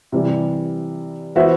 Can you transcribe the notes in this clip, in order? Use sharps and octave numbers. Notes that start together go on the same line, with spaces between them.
C3 E3 G3
E3 B3 F#4 C5 E5